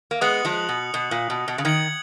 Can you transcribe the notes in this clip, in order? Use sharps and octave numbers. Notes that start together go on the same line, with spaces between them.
A#3
G#3 B3 D#6 F#6 C#7 F#7
F3 G#3
B2
B2
A#2
B2
B2
C#3
D#3 G#6 C#7 F#7